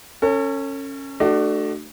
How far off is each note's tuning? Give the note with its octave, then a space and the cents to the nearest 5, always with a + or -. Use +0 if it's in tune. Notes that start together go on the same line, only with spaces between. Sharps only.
C#4 -10 A4 +40
A3 +0 D4 +30 F#4 +30